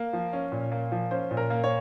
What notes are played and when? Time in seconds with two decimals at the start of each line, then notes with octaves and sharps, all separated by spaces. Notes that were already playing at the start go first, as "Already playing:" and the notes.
Already playing: A#3
0.13 F3
0.33 C#4
0.52 A#2
0.72 A#3
0.92 F3
1.11 C#4 C5
1.31 A#2
1.37 A#4
1.50 A#3
1.64 C#5